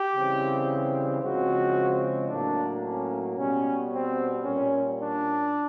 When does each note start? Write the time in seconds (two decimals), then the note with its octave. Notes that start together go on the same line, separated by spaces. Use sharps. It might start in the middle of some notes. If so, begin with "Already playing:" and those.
Already playing: G4
0.14 C#3 E3 G3 C4
1.22 C#3 F3 G#3 C4 F#4
2.29 A2 F#3 A#3 D4
2.84 C#4
3.36 B2 G3 B3 C#4
3.91 C4
4.44 A#2 G3 A#3 C#4
4.98 D4